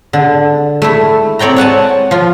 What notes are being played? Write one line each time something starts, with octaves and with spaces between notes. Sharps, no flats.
D3
A3 E4
C4 C#5 D5 G5 A#5
C#5 F#5 G#5 A5
F3 F4